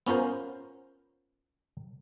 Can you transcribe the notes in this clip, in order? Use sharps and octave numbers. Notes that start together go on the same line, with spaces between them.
B3 C#4 F4 A#4 C5